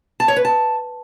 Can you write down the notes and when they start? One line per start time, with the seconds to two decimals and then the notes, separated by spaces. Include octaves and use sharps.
0.20 A5
0.28 C#5
0.36 B4
0.45 A5